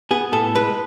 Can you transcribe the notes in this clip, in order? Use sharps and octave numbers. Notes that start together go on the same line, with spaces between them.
B3 G#4
A2 A4
G#3 B4